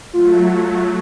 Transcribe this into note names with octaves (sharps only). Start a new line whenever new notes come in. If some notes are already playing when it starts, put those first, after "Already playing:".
F#3 A3 F4
F4